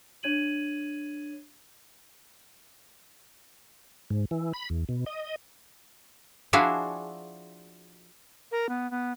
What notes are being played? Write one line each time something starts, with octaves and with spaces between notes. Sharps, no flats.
D4 C#5 G#6 D#7 F#7
G#2
E3
B5
E2
B2
D#5
F3 D4 E4 F#4 G#4 F5
A#4
B3
B3